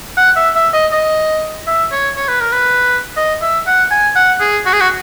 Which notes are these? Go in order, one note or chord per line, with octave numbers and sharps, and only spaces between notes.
F#5
E5
E5
D#5
D#5
E5
C#5
C#5
B4
A#4
B4
D#5
E5
F#5
G#5
F#5
G#4
F#4
G#4
F#4